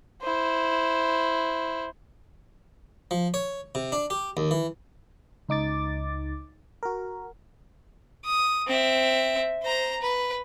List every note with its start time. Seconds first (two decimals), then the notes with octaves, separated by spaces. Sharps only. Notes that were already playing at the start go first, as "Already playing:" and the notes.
0.22 E4 C5
3.11 F3
3.34 C#5
3.75 C3
3.92 D4
4.10 G4
4.37 D#2
4.51 E3
5.49 C#2 D#4 D6 A6
6.83 F#4 A#4
8.25 D#6
8.67 C4 E5
9.63 C5 A#5
10.01 B4